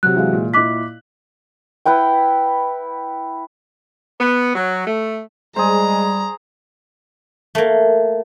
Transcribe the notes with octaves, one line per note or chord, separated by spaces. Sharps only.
C3 F#3 F#6
E3 G#3 F5
A#2
E4 D#5 D6 F#6 B6
E4 B4 F#5 G5
B3
F#3
A3
G3 G#3 G#4 C5 A#5
A3 A#3